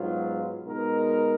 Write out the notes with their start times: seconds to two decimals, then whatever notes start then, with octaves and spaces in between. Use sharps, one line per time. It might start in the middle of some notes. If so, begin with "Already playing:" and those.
Already playing: G#2 F#3 B3 F4
0.64 B2 G#3 D#4 A#4